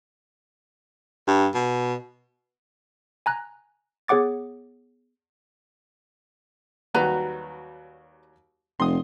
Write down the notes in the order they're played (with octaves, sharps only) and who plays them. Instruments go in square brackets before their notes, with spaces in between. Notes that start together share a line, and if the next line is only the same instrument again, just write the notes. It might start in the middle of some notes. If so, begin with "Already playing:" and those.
[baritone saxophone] G2
B2
[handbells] G#5 A#5 F#6
B3 G#4 C#5 F#5 D6 A6
[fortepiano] D#2 F#3 G3 [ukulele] F#4 B4 A#5
[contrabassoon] F1 [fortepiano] C6 D#6